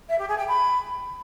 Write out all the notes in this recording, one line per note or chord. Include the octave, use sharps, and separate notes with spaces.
E5
G4
G#4
G5
B5